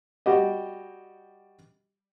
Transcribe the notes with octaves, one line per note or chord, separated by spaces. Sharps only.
G3 F#4 G4 D#5